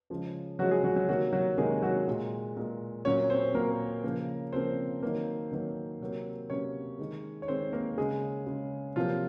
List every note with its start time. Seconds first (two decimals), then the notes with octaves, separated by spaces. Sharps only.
0.10 C#3 F3 G#3
0.59 C#3 F3 F#3 G#3 F#4
0.71 G#3 G#4
0.84 F#3 F#4
0.96 F#3 F#4
1.08 C3 D#3 F#3 A#3 F#4
1.33 F#3 F#4
1.58 C3 D#3 F#3 G#3 A#3 G#4
1.83 F#3 F#4
2.08 A#2 G#3
2.57 A#2 G#3
3.05 A#2 F#3 A#3 C#4 C#5
3.30 C4 C5
3.54 A#2 F#3 A#3 A#4
4.04 C#3 F3 A#3
4.53 C#3 F3 A#3 C4 C5
5.02 D#3 F#3 A#3
5.52 D#3 F#3 A#3
6.00 C3 F#3 A#3
6.50 C3 F#3 A#3 C#4 C#5
6.99 D#3 G#3
7.42 C#5
7.48 D#3 G#3 C4 C5
7.73 A#3 A#4
7.97 C#3 G#3 G#4
8.47 C#3 G#3
8.96 C3 F3 F#3 A#3 F4